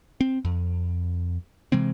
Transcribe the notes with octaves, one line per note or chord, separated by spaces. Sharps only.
C4
F2
C3 E3 G#3 C4